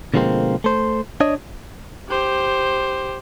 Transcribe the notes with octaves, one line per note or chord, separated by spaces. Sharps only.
B2 D3 F3 G#3 A#3 C4
A3 C5
D4 C#5 D#5
G4 C5